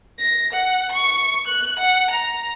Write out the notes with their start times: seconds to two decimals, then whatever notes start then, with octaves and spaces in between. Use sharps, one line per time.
0.19 A#6
0.53 F#5
0.92 C#6
1.47 F#6
1.79 F#5
2.10 A#5